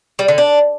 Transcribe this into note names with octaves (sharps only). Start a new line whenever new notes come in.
G3
D3
D4